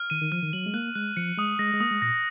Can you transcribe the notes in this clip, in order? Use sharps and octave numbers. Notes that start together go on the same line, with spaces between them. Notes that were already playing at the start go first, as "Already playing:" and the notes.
Already playing: F6
D#3 D#7
D#3
F3 F6
D#3
F#3 F#7
G#3
A#3 F#6
G#3 F#6
F3 C#7
G#3 D#6
G#3 A#6
G#3
A#3 D#6
G#3
A#2 A#6